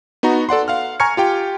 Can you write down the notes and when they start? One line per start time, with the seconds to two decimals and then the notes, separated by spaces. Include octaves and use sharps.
0.23 B3 D#4 F#4 A#5
0.49 A4 D5 F#5 C6
0.68 F5 F#5 F6
1.00 G#5 A#5 C#6 F6 G#6 C#7
1.17 F4 G4 G5